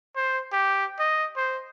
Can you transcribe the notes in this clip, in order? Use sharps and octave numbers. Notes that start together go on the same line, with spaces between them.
C5
G4
D#5
C5